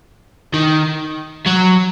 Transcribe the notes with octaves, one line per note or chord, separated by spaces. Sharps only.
D#3
F#3